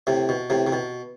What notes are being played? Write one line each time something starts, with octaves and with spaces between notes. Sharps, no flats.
A2 C3
B2
A2 C3
C3
B2